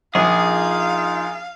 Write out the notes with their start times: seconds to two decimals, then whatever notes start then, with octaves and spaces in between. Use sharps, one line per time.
0.15 A#1 D#4 F4 G#4 F5